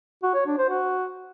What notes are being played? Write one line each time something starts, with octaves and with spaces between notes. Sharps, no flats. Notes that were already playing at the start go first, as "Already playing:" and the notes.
F#4
C#5
D4
C5
F#4